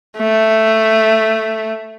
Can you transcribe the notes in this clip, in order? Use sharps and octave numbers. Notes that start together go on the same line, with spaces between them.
A3